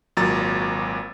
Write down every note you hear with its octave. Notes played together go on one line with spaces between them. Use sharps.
G#1 A#2 F#3 A#5 A6